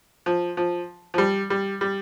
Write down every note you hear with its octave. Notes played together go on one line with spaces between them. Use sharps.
F3
F3
F3
G3
G3
G3